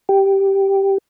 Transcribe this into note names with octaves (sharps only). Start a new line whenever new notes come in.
G4